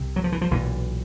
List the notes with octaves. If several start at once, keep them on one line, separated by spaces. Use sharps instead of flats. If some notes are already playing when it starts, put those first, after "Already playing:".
Already playing: C2 C3
F#3
F3
E3
F3
B1 A#2 E3